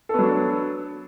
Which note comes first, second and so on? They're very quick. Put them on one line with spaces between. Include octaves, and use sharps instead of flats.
A4 B3 F#3 D4